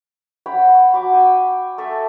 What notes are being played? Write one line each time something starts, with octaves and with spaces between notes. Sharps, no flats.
C#5 F#5 G5 B5
F#4 B5 C#6 D6
G5 G#5
A3 A4 E5